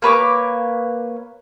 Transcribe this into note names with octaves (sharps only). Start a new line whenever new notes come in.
A#3 B4 C#5 D6